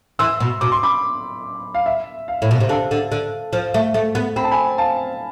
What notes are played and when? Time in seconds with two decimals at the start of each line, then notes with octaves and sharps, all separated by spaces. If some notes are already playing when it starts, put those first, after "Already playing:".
0.19 E3 C6 E6
0.40 B2
0.61 B2 D6
0.72 C6
0.83 B5 D6
1.75 F5
1.86 E5
2.28 F5
2.42 A2
2.51 B2
2.60 C3
2.69 D3 F5 A5
2.91 D3
3.12 D3
3.53 F3
3.74 A3
3.94 A3
4.15 B3
4.36 C4 B5
4.44 A5
4.51 G#5 B5
4.78 F5 A5